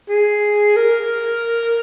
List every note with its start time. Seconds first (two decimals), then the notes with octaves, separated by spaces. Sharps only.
0.09 G#4
0.77 A#4